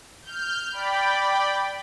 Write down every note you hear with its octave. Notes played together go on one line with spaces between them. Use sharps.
F6 G6
D5 G5 B5